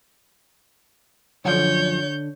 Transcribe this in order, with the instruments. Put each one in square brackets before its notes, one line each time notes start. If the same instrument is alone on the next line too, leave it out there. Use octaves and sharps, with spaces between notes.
[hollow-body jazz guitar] F#2 F3 [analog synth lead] D3 [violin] C#5 G6